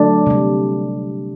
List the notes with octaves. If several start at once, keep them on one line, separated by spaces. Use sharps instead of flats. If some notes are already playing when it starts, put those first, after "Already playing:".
Already playing: D3 F#3 A3 D4
C3 G3